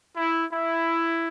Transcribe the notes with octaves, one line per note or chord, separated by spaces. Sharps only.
E4
E4